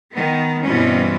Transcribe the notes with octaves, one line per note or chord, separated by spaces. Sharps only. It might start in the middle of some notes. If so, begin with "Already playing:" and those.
D#3 B3
G2 B2 E3 C4 C#4